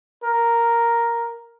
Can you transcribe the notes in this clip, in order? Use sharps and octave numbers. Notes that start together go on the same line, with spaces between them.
A#4